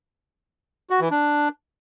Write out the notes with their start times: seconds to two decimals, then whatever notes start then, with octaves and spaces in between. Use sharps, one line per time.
0.90 F#4
1.00 E3
1.11 D4